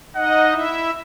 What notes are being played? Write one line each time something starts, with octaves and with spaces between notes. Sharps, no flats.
D#4 D#5 F#5
E4 E5